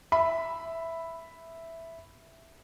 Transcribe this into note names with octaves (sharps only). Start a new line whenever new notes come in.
E5 B5